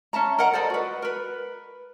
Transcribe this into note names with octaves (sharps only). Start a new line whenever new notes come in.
C#4 E5 A5 A#5
A#4 D#5 F#5 A#5
A4 C5 D5 D#5
F#4 B4
A#4 B4